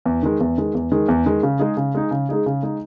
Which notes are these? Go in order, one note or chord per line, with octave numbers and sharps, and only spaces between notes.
E2
D#3 G#3
E2
D#3 G#3
E2
D#3 G#3
E2
D#3 G#3
C#3
G#3 D#4 G#4
C#3
G#3 D#4 G#4
C#3
G#3 D#4 G#4
C#3
G#3 D#4 G#4